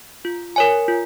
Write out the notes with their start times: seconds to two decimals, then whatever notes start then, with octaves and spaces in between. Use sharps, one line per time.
0.25 F4
0.56 A#4 C#5 G#5
0.88 F4